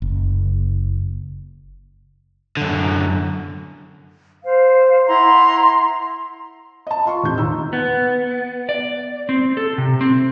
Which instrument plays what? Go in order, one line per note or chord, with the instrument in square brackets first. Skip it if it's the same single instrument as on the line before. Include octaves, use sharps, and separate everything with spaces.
[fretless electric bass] F#1
[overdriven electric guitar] F#2 D3
[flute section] C5 F5
E4 F#5 A#5 C6
[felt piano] D#5 A5
F4 C6 C#6
E1 A2 C3 D#3 G6
D#2 D#4 E6
[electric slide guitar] B3
D5
C4
A4
C3
C4